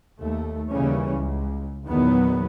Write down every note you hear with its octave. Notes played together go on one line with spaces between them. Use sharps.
D#2 A3
D#2 C#3 E3 G3 C#4
C#2
E2 A#2 D#3 F#3 B3